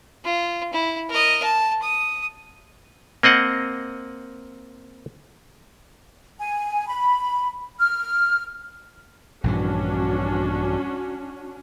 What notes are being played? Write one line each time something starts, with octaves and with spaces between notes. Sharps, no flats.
F4
E4
A#4 D#5
A5
D#6
A#3 C4 D#5 F#5
G#5
B5
F6
A#1 G2 E3 C#4 D4 F#4